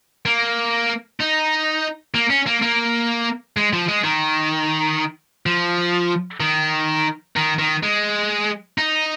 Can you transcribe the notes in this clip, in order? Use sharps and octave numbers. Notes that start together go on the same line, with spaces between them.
A#3
D#4
A#3
C#4
A#3
A#3
G#3
F3
G#3
D#3
F3
D#3
D#3
D#3
G#3
D#4